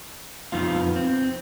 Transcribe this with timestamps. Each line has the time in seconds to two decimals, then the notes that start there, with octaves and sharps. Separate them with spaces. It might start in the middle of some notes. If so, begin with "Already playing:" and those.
0.52 F2 B3 D#4 F4 F5
0.96 C4